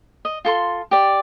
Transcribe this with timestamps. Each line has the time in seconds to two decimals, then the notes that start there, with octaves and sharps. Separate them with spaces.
0.25 D#5
0.45 F4 A4 C6
0.91 G4 D5